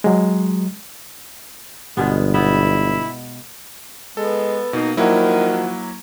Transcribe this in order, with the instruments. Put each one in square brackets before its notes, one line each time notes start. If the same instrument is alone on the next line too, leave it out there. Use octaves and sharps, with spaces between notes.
[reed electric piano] F#3 G#3
[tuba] G1 [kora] B2 G#3 B3
[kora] B3 [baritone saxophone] E4
[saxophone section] G#3 [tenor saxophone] B3 [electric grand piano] A4
[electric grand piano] B2 [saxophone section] A#3 D#4
[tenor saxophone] D#3 [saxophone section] F3 F#4 [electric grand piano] F#3 A#3 E4